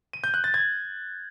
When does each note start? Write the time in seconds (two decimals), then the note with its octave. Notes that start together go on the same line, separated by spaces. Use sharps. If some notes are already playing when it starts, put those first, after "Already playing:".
0.13 D#7
0.24 G6
0.34 F#6
0.44 A6
0.54 G#6